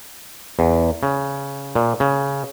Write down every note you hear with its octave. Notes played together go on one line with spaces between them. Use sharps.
E2
C#3
A#2
C#3